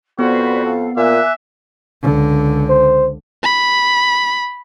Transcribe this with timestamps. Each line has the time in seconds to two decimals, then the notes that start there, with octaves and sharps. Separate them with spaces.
0.19 F2 B3 F#4 B4 C5 D5
0.64 A4 F5
0.97 A#2 E5 G#5 D6 F#6
2.02 C#2 D3
2.69 C5
3.43 B5